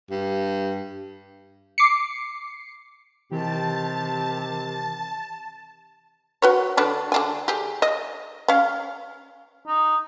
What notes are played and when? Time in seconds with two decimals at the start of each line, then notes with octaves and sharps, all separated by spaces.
0.10 G2
1.78 D6 C7 C#7
3.32 C3 D#3 E3 G4 A5
6.42 F#4 B4 C#5
6.77 D3 D4 B4
7.12 D3 D4 G#5
7.48 G4 G#4
7.82 D#5
8.48 C#4 F5
9.67 D#4